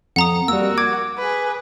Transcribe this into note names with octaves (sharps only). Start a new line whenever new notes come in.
F2 F#5 A#5 D#6
G3 A#3 F#4 A#4 E6
D6 G#6
G#4 B4